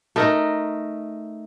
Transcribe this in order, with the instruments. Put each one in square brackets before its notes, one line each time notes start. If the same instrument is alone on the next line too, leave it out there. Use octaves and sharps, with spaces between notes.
[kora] A3 D#4 A#4